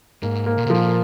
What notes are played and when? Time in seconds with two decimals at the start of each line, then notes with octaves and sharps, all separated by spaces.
0.22 G#2 A#3
0.46 A#3
0.58 A#2
0.66 C3
0.70 A#2 F3